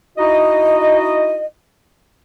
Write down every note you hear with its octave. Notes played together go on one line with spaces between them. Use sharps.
D#4 E4 F#4 D#5